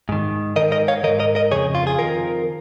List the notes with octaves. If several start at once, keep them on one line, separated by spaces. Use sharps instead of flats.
G#2 D#3
G#2 D#3 A#4 D#5
A#4 D#5
C#5 F5
D#3 A#4 D#5
G#2
A#4 D#5
A#4 D#5
F2 C#3 G#4 C#5
F4
G#4
F2 D#3 F4 A#4